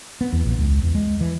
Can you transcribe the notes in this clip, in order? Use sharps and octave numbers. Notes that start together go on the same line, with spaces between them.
B3
E2
A#1
C#2
E2
G#3
E3